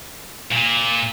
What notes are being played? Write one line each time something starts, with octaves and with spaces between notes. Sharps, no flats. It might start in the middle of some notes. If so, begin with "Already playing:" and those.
A#2